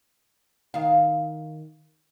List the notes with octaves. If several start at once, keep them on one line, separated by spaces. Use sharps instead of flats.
D#3 F5